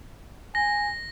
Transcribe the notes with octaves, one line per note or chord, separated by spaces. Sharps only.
G#5 A#6